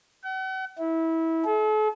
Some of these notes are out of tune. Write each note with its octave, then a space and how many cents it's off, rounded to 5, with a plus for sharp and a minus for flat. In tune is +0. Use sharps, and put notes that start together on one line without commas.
F#5 +40
E4 -20
A4 -45